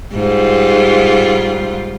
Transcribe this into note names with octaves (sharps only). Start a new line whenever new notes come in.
G#2 G3 F4